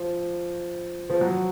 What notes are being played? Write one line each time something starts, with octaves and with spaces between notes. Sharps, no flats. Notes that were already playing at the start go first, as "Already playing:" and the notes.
Already playing: F3
F3
F#3